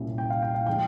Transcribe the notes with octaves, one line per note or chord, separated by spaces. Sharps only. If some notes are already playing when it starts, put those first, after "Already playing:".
Already playing: C2 A#2 G3 C#4
G5
F5
G5
F5
F3 G#3 D#4 G5